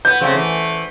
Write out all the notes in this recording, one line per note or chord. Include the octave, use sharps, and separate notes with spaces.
B3 G6
C#3 F#3 A3 C4
E3